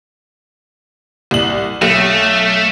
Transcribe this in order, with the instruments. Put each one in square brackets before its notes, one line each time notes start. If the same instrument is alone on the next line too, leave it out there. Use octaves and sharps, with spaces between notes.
[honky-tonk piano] C2 F#7
[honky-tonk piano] B1 [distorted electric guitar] A3